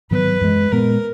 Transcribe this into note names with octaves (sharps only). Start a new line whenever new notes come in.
G#2 D#3 F#3 B3 B4
F#2 E3 G#3
A#2 G#3 B3 A#4